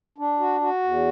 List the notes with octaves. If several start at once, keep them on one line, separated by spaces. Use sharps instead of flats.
D4
F#4
F#4
E2